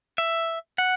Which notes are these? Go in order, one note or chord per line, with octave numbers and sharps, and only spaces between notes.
E5
F#5